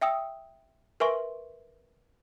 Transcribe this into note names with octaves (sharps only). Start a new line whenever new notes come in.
E5 G5 D#6 E6
A#4 B4 E5 G#5 C6 C#6